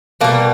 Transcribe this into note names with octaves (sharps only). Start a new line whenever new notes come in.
B2 G3 A#3